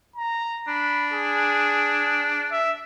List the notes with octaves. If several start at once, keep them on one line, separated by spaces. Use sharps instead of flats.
A#5
D4 B5
G#4
E5